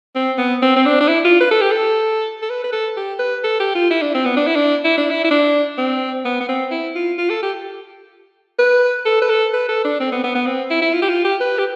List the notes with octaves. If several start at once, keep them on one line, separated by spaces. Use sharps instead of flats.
C4
B3
C4
C4
D4
D4
E4
F4
B4
A4
G4
A4
A4
B4
B4
A4
G4
B4
A4
G4
F4
E4
D4
C4
B3
D4
E4
D4
E4
D4
E4
E4
D4
C4
B3
B3
C4
E4
F4
F4
A4
G4
B4
A4
B4
A4
B4
A4
D4
C4
B3
B3
B3
C4
E4
E4
F4
G4
F4
G4
B4
G4